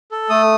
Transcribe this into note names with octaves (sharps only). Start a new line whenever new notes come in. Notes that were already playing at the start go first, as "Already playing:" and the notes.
A4
A3 D#6